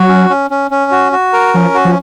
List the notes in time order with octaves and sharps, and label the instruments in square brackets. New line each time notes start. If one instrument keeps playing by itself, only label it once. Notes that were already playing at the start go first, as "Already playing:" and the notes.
Already playing: [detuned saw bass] F#3 [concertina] F#4
[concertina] C#4
C#4
C#4
C#4
F#4
F#4
A#4
[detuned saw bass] F3 [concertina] C#4
[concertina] F#4
[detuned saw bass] F3